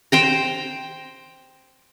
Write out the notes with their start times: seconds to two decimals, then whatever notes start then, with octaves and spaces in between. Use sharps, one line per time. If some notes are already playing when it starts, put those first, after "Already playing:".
0.12 C5 G5 A#5